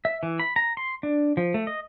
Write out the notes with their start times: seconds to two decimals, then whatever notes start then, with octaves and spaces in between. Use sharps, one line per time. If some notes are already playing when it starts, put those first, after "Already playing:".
0.05 E5
0.23 E3
0.39 B5
0.56 A#5
0.77 C6
1.03 D4
1.37 F3
1.54 A3
1.67 D#5